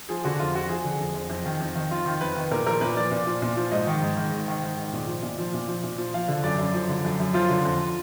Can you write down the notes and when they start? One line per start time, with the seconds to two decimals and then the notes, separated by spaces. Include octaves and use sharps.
0.09 F3 G#4
0.24 D3 F#4
0.39 F2 F4
0.54 F2 F#4
0.69 F3 G#4
0.84 D3
1.00 F2
1.14 F2
1.30 F2
1.46 D#3
1.60 F2
1.76 D#3
1.91 F2 F4
2.06 D#3
2.21 F2 B4
2.37 D#3
2.51 A#2 A#4
2.66 F3 A#4
2.81 A#2 B4
2.97 F3 D5
3.11 A#2
3.27 F3
3.42 A#2
3.57 F3
3.72 G#2 D#5
3.87 D#3
4.02 G#2
4.17 D#3
4.32 G#2
4.48 D#3
4.63 G#2
4.77 D#3
4.93 A#2
5.07 F3
5.22 A#2
5.38 F3
5.54 A#2
5.68 F3
5.83 A#2
5.98 F3
6.14 F3 F5
6.28 D3
6.43 F#2 D5
6.58 F#2
6.74 F3
6.89 D3
7.05 F#2
7.20 F#2
7.34 F3 F4
7.50 D3
7.65 F2